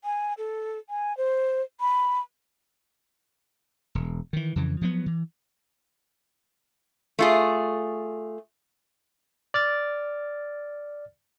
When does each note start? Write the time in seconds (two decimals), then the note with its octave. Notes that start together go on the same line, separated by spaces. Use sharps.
0.04 G#5
0.38 A4
0.89 G#5
1.17 C5
1.80 B5
3.95 E1
4.33 D#3 E3
4.56 F2 C#3 E3
4.81 F3 F#3 A3 B3
5.06 E3
7.19 A3 F4 G#4
9.54 D5 F6 A6